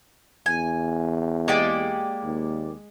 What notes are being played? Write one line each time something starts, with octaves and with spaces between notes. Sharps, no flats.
E2 G#5
G#3 A#3 G4 D5
D#2